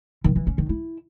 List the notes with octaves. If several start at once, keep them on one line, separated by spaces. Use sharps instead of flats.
D#3
E3
C#4
D#3
E4